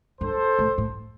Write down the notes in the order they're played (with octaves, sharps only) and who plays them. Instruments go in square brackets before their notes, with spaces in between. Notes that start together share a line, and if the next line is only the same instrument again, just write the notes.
[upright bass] G2 [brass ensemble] A4 C5
[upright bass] A2
A2